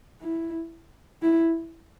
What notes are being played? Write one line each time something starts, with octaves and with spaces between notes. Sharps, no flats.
E4
E4